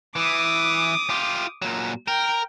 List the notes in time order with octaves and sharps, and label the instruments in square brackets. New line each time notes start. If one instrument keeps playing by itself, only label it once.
[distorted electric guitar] E3 [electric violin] D6 D#6
[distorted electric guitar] F4 G4
A#2 F#3
[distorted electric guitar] A#4 [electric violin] G5